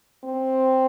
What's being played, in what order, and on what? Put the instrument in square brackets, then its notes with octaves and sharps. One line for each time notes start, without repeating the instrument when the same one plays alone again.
[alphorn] C4